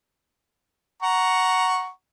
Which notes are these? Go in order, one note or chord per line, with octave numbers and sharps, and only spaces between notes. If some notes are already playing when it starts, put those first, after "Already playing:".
F#5 A#5 C#6